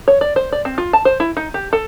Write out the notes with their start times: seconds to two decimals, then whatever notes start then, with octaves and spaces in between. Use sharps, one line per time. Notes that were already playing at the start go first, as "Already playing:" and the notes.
0.08 C#5
0.21 D5
0.36 C5
0.52 D5
0.65 C4
0.78 F4
0.93 A5
1.05 C5
1.20 E4
1.37 D#4
1.54 G4
1.73 A4